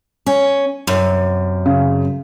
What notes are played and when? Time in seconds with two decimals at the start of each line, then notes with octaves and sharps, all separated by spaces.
0.26 C#4
0.87 F#2 C3
1.66 C#3